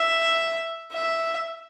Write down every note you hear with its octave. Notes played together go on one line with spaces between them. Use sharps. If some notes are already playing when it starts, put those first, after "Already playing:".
Already playing: E5
E5